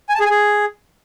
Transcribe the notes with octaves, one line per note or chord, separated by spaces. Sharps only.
G#5
A5
G#4
G#5
G#4